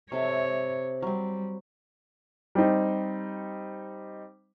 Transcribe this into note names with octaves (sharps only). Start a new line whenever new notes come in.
C3 A4 C#5 E5
F#3 G3 C4
G3 C4 D#4